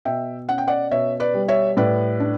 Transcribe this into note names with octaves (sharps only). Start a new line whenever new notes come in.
B2 E5 G5
C#4 F#5
G5
D5 F#5
B2 C#5 E5
B4 D5
G3
C#5 E5
A2 B4 D5
D4